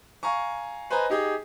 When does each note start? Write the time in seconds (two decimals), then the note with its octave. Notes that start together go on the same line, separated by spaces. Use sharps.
0.23 F5 G#5 A#5 C#6
0.90 B4 C5 D#5 G#5 A#5
1.10 D#4 G4 G#4